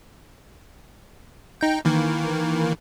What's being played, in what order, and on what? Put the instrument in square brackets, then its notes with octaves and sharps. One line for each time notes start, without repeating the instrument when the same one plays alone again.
[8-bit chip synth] D#4 G5
D#3 E3 A#3